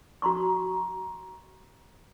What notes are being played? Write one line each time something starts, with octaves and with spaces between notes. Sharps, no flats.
F#4 A#5 C6 C#6